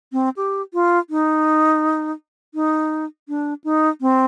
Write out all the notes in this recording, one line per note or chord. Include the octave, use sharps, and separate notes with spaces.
C4
G4
F4
D#4
D#4
D4
D#4
C4